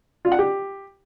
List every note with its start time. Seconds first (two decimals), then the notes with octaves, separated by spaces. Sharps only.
0.25 F4
0.32 F#5
0.39 G4